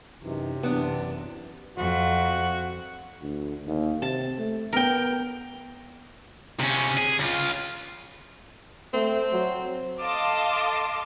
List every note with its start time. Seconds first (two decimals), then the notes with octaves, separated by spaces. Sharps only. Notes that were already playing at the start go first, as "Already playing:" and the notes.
0.23 F#2 C3 E3 D#4
0.63 F#2 E3 B3 D4
1.77 F2 F#4
3.21 D2
3.66 D#2
4.02 C3 A5
4.38 A3
4.73 B3 A#4 G5
6.60 C3 C#4
6.97 G#4
7.19 C#2 F4
8.94 A3 C4
9.33 F#3
10.00 A4 D#5 F5 A5 C6 D6